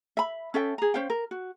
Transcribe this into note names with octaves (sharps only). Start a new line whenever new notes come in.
E5 B5
C#4 A4 E5 G5
G#4 A#5
C#4 C5 F5 G5
A#4
F#4